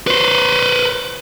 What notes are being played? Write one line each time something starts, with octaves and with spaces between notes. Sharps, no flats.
B4 C5